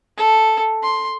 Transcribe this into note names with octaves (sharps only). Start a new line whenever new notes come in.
A4
C6